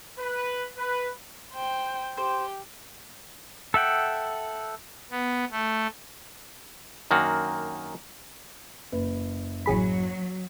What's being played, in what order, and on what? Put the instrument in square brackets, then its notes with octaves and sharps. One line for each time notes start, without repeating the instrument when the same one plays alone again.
[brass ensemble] B4
B4
[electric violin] C5 G5
[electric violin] G4 G5 [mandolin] C5
[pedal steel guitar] A4 E5 F#5 G5
[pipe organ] B3
A3
[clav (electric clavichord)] F#2 D#3 A#3 D4 F#4
[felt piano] F#1 B4
[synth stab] A1 G#4 B5 [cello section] F#3